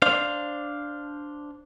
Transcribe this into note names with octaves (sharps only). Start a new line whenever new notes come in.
D4 C5 F5